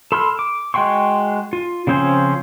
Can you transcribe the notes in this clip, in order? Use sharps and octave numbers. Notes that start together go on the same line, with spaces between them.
A4 B5 C6 E6 F6
D6
G#3 F#4 G5 C6 C#6
F4
C#3 F3 C4 C#4 C5